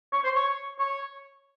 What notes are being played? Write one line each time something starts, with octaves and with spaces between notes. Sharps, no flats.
C#5
C5
C#5
C#5